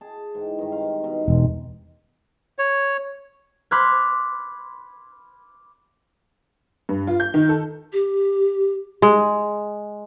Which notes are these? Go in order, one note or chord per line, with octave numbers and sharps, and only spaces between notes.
G#4 A5
G#2 E3 G5
G2 D#3
C4 F5
B2 D#3 D#4
E1 C3 G#3
C#5
B5 C6 D6 F6 F#6 G#6
G2
F4
G6
D#3
A4
G4
G#3